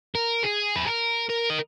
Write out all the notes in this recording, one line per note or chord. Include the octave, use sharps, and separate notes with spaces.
A#4
G#4
B4
A#4
A#4
D#5